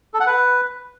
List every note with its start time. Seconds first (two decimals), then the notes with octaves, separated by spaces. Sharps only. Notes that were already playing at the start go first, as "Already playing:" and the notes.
0.14 A4
0.20 F#5
0.27 B4